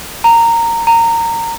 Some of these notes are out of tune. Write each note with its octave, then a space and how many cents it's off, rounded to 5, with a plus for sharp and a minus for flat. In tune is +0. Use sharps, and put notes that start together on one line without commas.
A#5 -15
A#5 -20